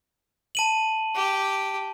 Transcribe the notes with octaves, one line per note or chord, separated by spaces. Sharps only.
A5 D#7 F#7
G4